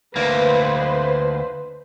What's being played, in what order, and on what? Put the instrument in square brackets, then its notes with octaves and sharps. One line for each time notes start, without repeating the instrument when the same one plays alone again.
[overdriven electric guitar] D2 A#3 [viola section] B4 C5